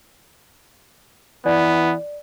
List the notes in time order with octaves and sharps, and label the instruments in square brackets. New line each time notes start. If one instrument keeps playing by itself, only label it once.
[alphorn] E3 [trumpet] B3 [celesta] D5